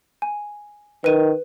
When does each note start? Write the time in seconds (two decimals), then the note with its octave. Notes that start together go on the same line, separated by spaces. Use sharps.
0.22 G#5
1.04 D#3 B4 D#7